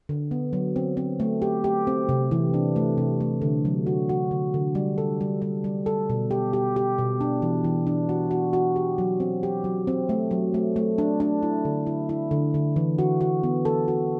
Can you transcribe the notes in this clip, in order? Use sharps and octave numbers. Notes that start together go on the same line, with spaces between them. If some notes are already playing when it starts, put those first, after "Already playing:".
D3
B3
F#3
C4
C4
A3
G4
G4
C4
C3
E3
D4
A3
C3
A3
D3
F#3
F#4
F#4
D3
D3
G3
A4
G3
G3
G3
A4
B2
G4
G4
G4
B2
D4
E3
E3
D4
F#4
F#4
F#4
G4
F#3
C4
G4
F#3
C4
A3
F#3
A3
A3
D4
D4
E4
D3
E4
E4
D3
D3
E3
F#4
F#4
B3
A4
F#4